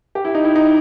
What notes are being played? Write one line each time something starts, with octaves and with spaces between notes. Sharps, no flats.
G4
E4
D#4
E4
D#4